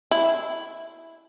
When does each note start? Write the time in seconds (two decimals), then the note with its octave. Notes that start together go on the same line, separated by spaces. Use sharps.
0.11 E4